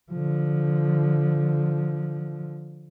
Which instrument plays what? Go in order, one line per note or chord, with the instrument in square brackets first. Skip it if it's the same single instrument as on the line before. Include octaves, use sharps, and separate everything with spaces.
[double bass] D3 F3